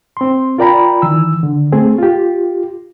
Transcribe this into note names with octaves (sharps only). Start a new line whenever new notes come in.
C4 C6
F4 A#4 D5 G5 A#5 B5
D#3 E3 E6
D3
A3 C4 G#4
F4 G4